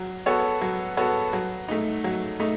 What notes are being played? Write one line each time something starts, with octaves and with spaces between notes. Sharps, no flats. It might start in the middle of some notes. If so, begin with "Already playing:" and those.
Already playing: F#3
B3 F#4 A4 C#5
F#3
B3 F#4 A4 C#5
F#3
A3 D#4
F#3
A3 D#4